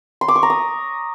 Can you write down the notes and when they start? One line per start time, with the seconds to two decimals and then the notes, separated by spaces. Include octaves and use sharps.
0.21 C6
0.28 D6
0.36 C#6
0.43 A#5
0.50 D#6